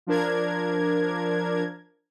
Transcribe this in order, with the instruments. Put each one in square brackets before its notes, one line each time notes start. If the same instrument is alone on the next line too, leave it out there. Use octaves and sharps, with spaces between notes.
[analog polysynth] F3 D4 A#4 G#6